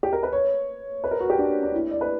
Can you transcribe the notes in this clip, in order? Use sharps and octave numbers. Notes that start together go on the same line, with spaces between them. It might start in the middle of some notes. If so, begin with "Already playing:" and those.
G4
A#4
B4
C#5
B4
A#4
F#4
G4
D4
D4
E4
D5
B4